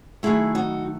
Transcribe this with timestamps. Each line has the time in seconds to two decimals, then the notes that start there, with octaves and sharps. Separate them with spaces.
0.23 D#3 F#3 A3 E4 G#4
0.55 D#4 F#4